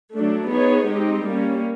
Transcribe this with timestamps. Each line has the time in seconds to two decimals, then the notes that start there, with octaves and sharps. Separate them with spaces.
0.15 F#3 A3 D4
0.51 B3 D#4 G#4 C#5
0.88 G#3 C4 D#4 G4
1.25 G3 A#3 C#4